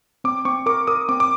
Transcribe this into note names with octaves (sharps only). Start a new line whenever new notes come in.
C4 D6
C4 C#6
A#4 D6
A#4 D#6
C4 D6
D6